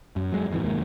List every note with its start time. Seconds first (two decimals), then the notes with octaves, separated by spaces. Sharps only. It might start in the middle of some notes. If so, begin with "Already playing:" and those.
0.16 F#2
0.32 F#3 G#3
0.50 D1 F2 G#2 E3
0.64 E1 D#2 G#2 A#3